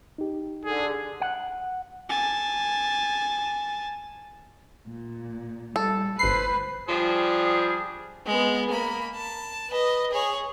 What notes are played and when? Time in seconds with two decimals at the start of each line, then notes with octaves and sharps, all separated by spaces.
0.18 D#4 G4
0.65 D3 G#4
1.22 F#5
2.09 G#5 A5
4.87 A#2
5.76 G3 A4
6.19 G1 B4 C5 B5 C7
6.88 F3 G3 D4 G#4
8.26 G#3 B3
8.70 A#3 B5
9.15 A5
9.70 B4 D#5
10.11 G#4 C#5